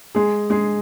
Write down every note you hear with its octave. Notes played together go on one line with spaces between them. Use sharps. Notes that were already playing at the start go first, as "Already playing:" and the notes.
G#3 G#4
G#3 G#4